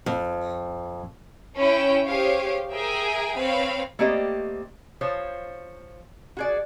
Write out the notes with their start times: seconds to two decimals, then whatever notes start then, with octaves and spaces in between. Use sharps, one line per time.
0.06 F2
1.56 C#4 E4 G5
2.06 G4 G#4 C5 C#5 F5
2.71 G#4 A#4 E5 G5 G#5 A#5
3.37 C4 B4 C#5 F5 B5
3.99 A3 A#3 C4 G4 D5 D#5
5.01 F3 C5 C#5
6.37 F#4 G#4 D5